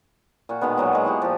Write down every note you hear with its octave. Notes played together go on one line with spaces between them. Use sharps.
A#2 F#4 G5
B2 D#3 G#3 B3
A#2 F#3 B3 D#5
G#3 D#5
E4 F#4 G4
A#2 F3